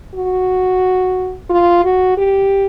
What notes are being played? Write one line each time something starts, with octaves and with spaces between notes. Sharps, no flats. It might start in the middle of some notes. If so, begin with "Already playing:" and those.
F#4
F4
F#4
G4